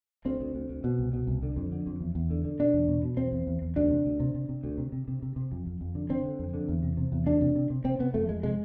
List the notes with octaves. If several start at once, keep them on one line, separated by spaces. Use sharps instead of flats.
D2 C4
D2
D2
D2
B2
C2
B2
C2
D3
F2
D3
F2
E2
E2
D3
D3
B2 D4
E2
B2
B2
E2 C4
E2
E2
E2
D2 D4
C3
D2
C3
C3
C3
D2
C3
C3
C3
C3
C3
F2
F2
F2
D3
D3 C4
D3
F2
D3
E2
C3
C3
E2
D2 D4
C3
C3
C3
C3 C4
C3 B3
F2 A3
F2 G#3
C3 G#3